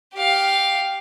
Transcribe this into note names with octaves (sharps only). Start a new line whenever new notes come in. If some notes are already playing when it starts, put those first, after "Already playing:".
G4 F5